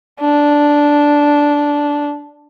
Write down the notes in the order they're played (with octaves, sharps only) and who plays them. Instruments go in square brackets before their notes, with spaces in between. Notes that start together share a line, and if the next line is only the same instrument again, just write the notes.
[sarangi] D4